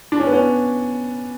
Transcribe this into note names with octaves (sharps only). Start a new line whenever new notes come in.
D4
C#4
B3
C#4